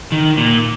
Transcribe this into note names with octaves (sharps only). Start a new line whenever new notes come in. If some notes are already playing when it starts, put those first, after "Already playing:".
D#3
A#2